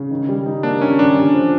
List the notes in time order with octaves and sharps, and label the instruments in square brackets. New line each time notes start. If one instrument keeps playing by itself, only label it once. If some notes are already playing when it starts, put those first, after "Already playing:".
Already playing: [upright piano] C#3
D#3
G3
D#4
[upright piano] A#3 [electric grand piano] D4
[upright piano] D#3 [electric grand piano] C#4
[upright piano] G3 [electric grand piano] D4
[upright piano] D3
F3